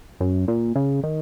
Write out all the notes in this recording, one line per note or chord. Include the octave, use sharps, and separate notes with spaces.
F#2
A#2
C#3
D#3